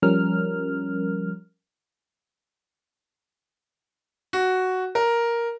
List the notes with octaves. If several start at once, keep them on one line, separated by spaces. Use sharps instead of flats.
F3 G3 C#4 A#4 F6
F#4
A#4